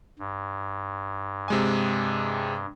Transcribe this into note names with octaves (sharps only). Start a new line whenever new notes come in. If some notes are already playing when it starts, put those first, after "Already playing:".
G2
C3 G#3 G#5